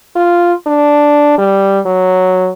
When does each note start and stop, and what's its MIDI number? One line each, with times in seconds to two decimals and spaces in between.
0.16 0.53 65
0.67 1.36 62
1.38 1.80 55
1.85 2.50 54